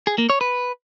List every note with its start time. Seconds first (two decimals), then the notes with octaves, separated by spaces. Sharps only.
0.07 G#4
0.18 A#3
0.30 C#5
0.41 B4